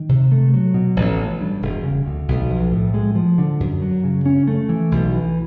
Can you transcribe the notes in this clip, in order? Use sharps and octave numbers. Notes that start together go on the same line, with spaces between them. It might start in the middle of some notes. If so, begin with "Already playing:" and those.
Already playing: D#3
C3
A3
F#3
B2
A1
E3
G2
E1
C#3
D2
B1
F3
A2
G#3
F3
D3
F#2
F#3
C#3
C#4
A3
E3
B1
E3